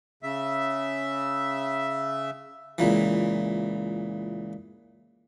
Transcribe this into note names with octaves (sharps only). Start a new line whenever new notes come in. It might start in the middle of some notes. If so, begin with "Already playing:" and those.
C#3 E5
C#2 A#2 E3